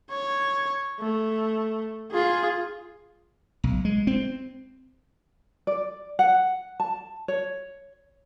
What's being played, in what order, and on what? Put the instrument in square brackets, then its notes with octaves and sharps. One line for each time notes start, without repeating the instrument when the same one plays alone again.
[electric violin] C#5
A3
F4 G#4
[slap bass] B1
G#3
C4
[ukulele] D5
F#5
A5
C#5